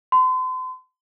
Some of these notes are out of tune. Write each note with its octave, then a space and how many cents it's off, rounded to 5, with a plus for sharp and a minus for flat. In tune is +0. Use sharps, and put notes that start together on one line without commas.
C6 -40